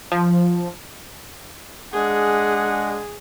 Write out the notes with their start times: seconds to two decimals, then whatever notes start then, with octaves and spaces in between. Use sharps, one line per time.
0.12 F3
1.94 G#3 D4 G#4 F#5